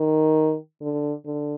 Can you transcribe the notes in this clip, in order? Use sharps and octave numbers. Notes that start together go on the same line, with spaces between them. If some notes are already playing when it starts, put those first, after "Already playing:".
Already playing: D#3
D3
D3